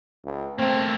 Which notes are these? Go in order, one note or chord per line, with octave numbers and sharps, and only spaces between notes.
C#2
A3 A#3 C4